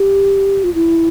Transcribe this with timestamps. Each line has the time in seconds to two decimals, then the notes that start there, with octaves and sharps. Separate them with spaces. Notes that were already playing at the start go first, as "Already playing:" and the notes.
Already playing: G4
0.64 F4
0.74 E4